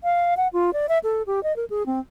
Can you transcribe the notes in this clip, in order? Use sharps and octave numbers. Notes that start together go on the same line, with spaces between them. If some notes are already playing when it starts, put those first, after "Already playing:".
F5
F#5
F4
D5
E5
A4
G4
D#5
A#4
G#4
C4